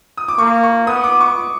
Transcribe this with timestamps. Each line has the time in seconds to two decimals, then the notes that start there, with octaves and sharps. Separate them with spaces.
0.17 D#6
0.28 D6
0.38 A#3 C#6
0.63 C#6
0.87 B3 D#6
1.04 D6
1.20 C#6